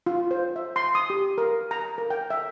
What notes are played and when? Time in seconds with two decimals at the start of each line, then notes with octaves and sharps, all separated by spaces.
0.06 F4
0.31 C5
0.56 E5
0.76 C6
0.95 D#6
1.10 G4
1.38 A#4
1.71 A#5
1.98 A#4
2.10 G5
2.30 E5